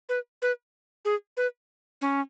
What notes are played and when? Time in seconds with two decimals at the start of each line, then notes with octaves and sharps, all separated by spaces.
0.09 B4
0.42 B4
1.05 G#4
1.37 B4
2.01 C#4